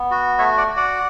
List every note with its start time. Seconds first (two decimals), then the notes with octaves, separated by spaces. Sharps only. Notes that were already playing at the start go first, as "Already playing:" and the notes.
Already playing: B3
0.11 F#4
0.39 A3 C#5 E5
0.57 D5 F#5
0.67 F#4
0.76 D5 F#5